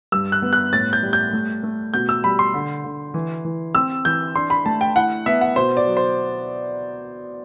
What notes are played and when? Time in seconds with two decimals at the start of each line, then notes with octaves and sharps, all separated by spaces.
0.12 G2 E6
0.32 F#6
0.42 B3
0.53 F#6
0.73 A2 A6
0.93 G6
1.03 G3
1.13 G6
1.33 A3
1.63 A3
1.94 B2 G6
2.09 E6
2.24 G3 B5
2.39 C6
2.54 D3
2.84 D3
3.14 E3
3.44 E3
3.75 C4 E6
4.05 E3 G6
4.35 D4 C6
4.50 B5
4.66 A3 A5
4.81 G5
4.96 E4 F#5
5.26 B3 E5
5.41 F#5
5.56 B2 C5
5.77 D5
5.86 F#3
5.97 C5